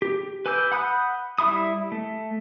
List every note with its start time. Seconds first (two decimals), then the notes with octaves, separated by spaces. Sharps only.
0.02 G4
0.46 B4 G#5 D6 E6 G6
0.72 F#5 B5 D#6 F#6 G6
1.38 G3 E4 E5 B5 D#6
1.92 A3